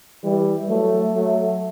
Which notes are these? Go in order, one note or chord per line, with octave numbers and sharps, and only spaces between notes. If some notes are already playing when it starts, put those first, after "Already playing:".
E3 G3
F#3 A3
F#3 A3